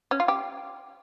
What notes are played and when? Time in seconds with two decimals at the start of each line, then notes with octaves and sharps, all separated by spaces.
0.11 C#4
0.20 F4
0.28 G4